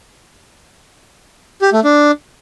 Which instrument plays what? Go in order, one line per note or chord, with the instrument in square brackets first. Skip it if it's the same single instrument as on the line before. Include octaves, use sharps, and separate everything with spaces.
[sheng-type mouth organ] G4
A3
D4